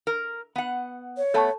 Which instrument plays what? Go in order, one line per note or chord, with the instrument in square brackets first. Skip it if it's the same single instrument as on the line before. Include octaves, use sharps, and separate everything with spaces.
[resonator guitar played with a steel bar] A#4
B3 F#5
[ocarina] C#5
[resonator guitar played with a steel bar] A3 B3 [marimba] A4 A5 C#6